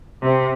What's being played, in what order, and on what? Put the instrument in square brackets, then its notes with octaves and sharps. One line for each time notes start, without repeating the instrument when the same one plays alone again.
[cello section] C3